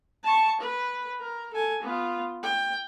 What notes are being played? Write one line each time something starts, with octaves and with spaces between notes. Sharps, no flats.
A5 C#6
B4
A#4
A4 G#5
B3 F4
G5